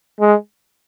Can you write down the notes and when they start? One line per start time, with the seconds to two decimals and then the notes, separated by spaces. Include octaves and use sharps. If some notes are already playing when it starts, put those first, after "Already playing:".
0.20 G#3